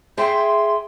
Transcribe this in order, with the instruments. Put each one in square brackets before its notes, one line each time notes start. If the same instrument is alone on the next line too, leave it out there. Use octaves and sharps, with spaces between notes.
[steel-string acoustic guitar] G#4 E5 G5 [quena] C6